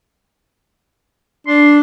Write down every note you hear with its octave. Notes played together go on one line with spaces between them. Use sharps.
D4 C6